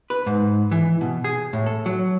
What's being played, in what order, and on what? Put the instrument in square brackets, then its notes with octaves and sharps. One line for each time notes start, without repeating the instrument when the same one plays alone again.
[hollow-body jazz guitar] B4
G#2
E3
B2
G#4
A2
A4
F#3